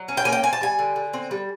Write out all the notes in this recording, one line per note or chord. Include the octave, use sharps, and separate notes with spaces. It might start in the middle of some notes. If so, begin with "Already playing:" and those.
Already playing: F#3
C#4
G5
A#3 G#5
G5
C4 G#5
A5
G3 G#5
D3
D3
C4
G3